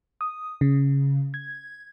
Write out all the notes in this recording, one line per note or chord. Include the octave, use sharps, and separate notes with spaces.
D#6
C#3
G#6